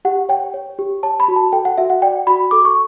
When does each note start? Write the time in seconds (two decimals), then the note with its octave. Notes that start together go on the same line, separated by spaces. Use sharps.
0.05 G4 F#5
0.29 C#5 G5
0.54 C#5
0.79 G4
1.03 C#5 A5
1.20 B5
1.28 F#4
1.36 A5
1.53 A4 G5
1.65 F#5
1.78 F#4 E5
1.90 F#5
2.02 D5 G5
2.27 F#4 B5
2.51 A4 D6
2.65 C#6